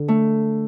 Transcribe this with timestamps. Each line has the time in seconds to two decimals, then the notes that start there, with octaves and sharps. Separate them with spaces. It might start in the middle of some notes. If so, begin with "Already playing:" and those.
Already playing: D3
0.08 A3